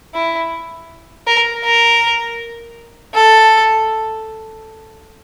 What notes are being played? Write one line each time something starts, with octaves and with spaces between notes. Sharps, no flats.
E4
A#4
A#4
A4